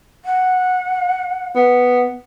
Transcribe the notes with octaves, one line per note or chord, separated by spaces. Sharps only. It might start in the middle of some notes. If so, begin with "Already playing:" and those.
F#5
B3